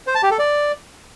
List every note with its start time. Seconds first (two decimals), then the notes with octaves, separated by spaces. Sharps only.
0.07 C5
0.15 A5
0.23 G4
0.31 A4
0.39 D5